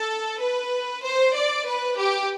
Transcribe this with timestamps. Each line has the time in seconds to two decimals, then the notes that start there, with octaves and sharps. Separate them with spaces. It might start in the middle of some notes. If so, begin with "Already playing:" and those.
Already playing: A4
0.40 B4
1.03 C5
1.35 D5
1.66 B4
1.98 G4